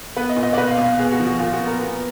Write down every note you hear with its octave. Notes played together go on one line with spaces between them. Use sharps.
B3 B4
D#5
A#2
D#5
D5
B2 B4
F5
B2
F5
B3 G#4
F#4
F3
F#4
A#2 F4
F#4
B3
A#4
B3